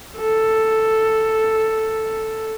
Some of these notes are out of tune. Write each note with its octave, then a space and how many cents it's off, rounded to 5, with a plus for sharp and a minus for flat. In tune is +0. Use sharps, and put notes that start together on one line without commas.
A4 +5